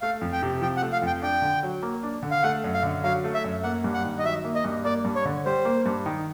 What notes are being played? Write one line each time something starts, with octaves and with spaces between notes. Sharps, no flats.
A3 F5
F2
G5
C3
F3 G5
F#5
A3
F5
F2 G5
D4 G5
D3
F#3
A#3
D4
D3
F5
A3 F#5
F#2
F5
D3
F#3 F5
A3
E5
F#2
A#3 F#5
G2
F#5
D#3
D#5
F#3 E5
A#3
D#5
G2
A#3 D5
G2
C#5
D3
G3 C5
A#3
G2
D#3